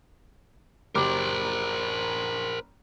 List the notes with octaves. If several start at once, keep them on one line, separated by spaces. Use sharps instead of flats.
F#1 G4 A#4 C5 D6